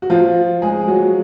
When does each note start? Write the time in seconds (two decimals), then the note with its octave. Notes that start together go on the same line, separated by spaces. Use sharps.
0.02 F#4
0.10 F3 F4
0.62 G#3 G#4
0.88 F#3 F#4